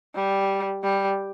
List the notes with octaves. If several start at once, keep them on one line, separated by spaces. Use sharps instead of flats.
G3
G3